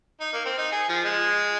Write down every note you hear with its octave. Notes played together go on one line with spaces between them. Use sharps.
D#4
A#3
C4
D#4
G#4
F3
G#3